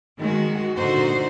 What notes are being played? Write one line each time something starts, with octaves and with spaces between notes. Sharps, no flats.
D#3 G#3 F#4
A#2 D3 D#4 F#4 C5